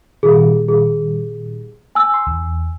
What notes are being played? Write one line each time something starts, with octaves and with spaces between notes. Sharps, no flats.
A#2 D#3 G3 G#4
G#4
G#5 E6
C6
E2